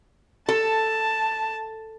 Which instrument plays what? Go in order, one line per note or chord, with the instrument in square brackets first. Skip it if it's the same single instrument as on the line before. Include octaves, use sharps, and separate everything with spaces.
[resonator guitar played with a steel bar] A4 [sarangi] A5